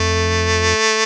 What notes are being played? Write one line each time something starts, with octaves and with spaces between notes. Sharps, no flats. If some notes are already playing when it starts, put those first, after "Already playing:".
Already playing: F2 A3